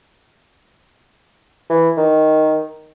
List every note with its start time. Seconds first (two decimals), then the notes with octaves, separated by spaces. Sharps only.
1.70 E3
1.97 D#3